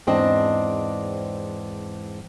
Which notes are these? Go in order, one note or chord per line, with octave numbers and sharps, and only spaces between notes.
E2 G#2 C4 D4 D#5